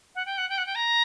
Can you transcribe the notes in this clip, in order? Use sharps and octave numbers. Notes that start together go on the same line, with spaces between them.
F#5
G5
F#5
G5
F#5
G5
A#5